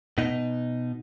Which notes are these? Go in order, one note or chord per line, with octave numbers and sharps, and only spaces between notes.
B2 D#4